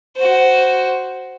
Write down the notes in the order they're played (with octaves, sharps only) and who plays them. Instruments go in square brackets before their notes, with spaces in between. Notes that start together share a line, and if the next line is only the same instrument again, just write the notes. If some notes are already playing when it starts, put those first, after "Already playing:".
[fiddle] F#4 C5